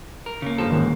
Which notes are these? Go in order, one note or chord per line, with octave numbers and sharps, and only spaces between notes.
A#4
C#3 A#3
G2 F3 A4
A1 G#2 D#3